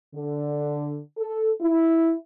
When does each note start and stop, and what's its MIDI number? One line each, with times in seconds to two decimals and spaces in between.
0.14 0.99 50
1.17 1.50 69
1.61 2.13 64